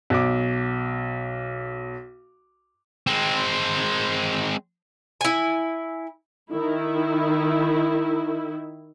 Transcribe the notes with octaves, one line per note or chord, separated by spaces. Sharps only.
B1 D6
G#3 C4
E4 G#5
D#3 E4